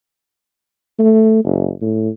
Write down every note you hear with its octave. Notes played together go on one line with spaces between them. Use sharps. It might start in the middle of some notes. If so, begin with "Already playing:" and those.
A3
F#1
A2